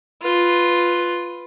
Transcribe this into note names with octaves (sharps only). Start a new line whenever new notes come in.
F4 B4